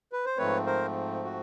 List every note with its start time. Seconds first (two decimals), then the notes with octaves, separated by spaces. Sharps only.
0.13 B4
0.25 C5
0.37 G#2 F3 A3 C4 B4 C#5
0.66 A#4 C5
1.24 F#4